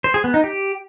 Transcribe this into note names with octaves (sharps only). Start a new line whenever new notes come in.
C5
G#4
B3
D#4
G4